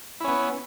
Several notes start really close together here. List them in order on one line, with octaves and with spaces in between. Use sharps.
E4 C#4 B3